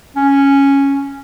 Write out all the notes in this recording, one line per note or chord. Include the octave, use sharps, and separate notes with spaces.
C#4